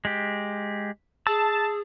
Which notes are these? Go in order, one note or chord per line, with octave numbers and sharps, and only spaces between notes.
G#3 G4
G#4 A5 E6